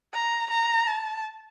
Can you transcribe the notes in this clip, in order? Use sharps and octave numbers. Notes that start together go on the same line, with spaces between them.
A#5
A#5
A5